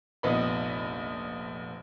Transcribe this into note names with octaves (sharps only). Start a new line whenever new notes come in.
F1 A#1 B3 B4 D#5 B5